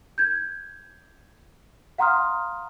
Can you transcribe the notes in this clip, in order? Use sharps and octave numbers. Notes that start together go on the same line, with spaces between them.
G6 G#6
F5 F#5 A#5 C6 D#6 F6